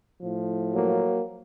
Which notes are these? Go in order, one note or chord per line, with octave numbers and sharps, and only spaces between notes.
A2 F3
F#3 A#3